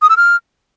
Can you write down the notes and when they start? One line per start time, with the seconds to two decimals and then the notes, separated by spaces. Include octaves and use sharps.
0.02 D#6
0.09 E6
0.17 F6